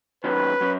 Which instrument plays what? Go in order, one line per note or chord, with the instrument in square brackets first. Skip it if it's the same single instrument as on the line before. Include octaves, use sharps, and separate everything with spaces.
[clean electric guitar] D#2 D#3 F#3 C#4 [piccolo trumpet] B4
[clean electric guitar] F#3 C#4